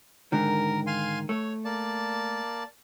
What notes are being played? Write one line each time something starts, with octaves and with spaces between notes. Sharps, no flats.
G#2 D3 D#3 A#4
F5 G#5 C6
A3 C#5
A#3 D5 A5